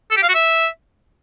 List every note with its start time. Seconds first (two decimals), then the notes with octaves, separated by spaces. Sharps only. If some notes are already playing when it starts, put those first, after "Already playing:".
0.11 A4
0.17 G4
0.23 F5
0.29 F#4
0.35 E5